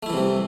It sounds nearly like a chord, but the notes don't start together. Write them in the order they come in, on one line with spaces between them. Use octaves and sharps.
A3 E4 E3 C3 G3